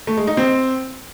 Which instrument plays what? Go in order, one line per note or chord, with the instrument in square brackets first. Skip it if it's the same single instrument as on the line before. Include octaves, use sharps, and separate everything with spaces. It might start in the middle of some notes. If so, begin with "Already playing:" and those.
[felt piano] A3
G#3
D#4
C4